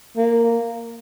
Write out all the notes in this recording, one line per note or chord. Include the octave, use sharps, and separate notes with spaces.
A#3